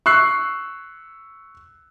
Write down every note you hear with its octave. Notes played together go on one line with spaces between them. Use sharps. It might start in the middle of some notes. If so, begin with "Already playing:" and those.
C#6 E6 F#6 C7